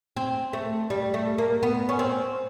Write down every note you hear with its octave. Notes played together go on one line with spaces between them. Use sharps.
C4
A3
G3
A3
A#3
B3
C#4
C4